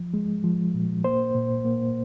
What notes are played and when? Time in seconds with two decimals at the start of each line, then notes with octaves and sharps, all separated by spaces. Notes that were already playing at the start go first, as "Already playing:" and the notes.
Already playing: F3
0.14 G#3
0.44 F3
0.74 A#2
1.04 A#3 C5
1.35 A#2
1.65 A#3